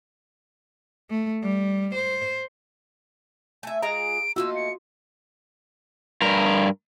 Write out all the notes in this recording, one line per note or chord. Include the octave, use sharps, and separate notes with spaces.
A3
G3
C5
A3 E5 G#5
G#3 F4 G#4 A#5 D7
A3 A#3 D#4 F4 F#4 E6
C#7
G2 A#4